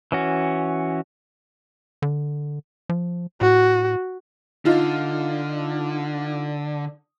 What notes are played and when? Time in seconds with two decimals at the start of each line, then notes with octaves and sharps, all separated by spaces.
0.12 E3 C#4 F#4
2.02 D3
2.89 F3
3.41 A2 F#4
4.65 D3 D#4 F4